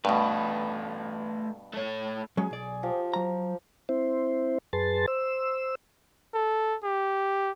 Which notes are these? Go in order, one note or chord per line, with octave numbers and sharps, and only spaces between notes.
G2 B2 A3 B4
A3 C#5
F#3 G#3 C#4 G#4
B1 D5
F3 G4
F#3 A#5
C4 E4 C5
F#2 G#4 B4 A5 C6 A6
C5 E6
A4
G4